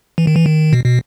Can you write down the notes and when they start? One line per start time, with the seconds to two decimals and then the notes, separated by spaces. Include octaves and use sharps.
0.18 E3
0.27 D#3
0.36 E3
0.46 D#3
0.73 B2
0.85 B2